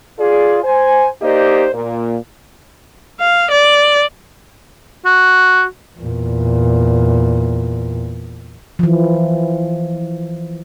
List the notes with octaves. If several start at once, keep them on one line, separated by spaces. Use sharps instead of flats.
F4 G#4 D5
C5 G#5
A#3 D#4 G4 C5 D5 D#5
A#2
F5
D5
F#4
E2 A#2
E3 F3